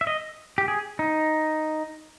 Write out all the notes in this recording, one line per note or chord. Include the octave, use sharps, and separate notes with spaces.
E5
D#5
G4
G#4
D#4